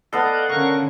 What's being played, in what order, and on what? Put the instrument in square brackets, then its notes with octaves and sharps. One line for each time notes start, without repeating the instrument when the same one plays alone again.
[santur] B3 A4 [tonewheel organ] D5 D#5 [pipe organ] F5 F#5
[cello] D3 C#4 [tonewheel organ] A#4 C#6